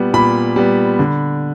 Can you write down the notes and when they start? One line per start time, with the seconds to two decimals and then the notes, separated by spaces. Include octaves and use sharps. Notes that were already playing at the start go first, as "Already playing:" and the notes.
Already playing: A#2 G3 B3
0.13 A#2 B5
0.56 G3 B3
0.99 D3